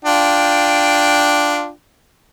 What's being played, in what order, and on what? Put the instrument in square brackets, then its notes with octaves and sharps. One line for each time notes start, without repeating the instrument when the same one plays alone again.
[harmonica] D4 F4 G5